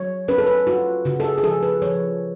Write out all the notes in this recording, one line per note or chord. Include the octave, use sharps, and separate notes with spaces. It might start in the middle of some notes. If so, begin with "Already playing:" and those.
Already playing: F#3 C#5
C#4 B4
A4
B4
F4 F#4
C#3 F#4
A4
G#4
G#4
F3 A4
B4
F3 C#5